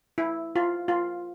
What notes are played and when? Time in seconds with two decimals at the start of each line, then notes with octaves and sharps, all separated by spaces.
0.18 E4
0.56 F4
0.88 F4